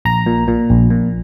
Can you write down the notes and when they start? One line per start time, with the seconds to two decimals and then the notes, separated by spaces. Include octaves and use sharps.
0.05 A#1 A#5
0.26 A#2
0.48 A#2
0.70 A#1
0.90 A#2